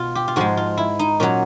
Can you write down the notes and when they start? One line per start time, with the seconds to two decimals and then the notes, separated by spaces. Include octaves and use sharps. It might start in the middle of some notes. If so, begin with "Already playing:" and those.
Already playing: B2 F4
0.15 G4
0.28 F4
0.36 G#2 F3 G#3 F#4
0.57 F4
0.77 E4
0.99 D#4
1.20 A#2 F#3 C#4